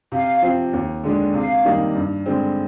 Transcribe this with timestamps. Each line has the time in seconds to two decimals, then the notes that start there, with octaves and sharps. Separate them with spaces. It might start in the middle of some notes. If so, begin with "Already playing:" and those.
0.12 C3 F5
0.42 F3 C4
0.73 D#2
1.04 D3 G#3 D4
1.34 C3 F5
1.65 D#3 G3 A#3 D#4
1.95 G2
2.26 D3 G#3 C4